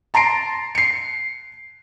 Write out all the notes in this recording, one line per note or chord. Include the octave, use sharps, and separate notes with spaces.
A5 A#5 C6 C7 D7
C7 C#7